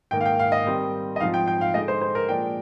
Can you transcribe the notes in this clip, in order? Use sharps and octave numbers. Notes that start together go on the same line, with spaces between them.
G#2 D#3 A#3 G5
F5
G5
F5
D#5
D#3 G3 C4
D#5
G#2 F3 C4 D#4 F5
G5
G5
F5
D3 G#3 D#4 D#5
C5
C5
A#4
A#2 F3 G#3 D4 G5